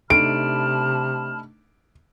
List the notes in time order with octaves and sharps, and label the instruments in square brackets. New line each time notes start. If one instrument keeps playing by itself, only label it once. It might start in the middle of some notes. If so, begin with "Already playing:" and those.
[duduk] C3 [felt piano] A3 D4 D#4 [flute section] A5 B5 F6 [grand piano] D7